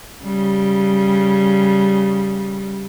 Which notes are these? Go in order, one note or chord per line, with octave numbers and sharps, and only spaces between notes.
C#3 G3